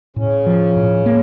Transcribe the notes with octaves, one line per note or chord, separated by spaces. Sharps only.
A2 C#3 C#4
F3
A2
A#3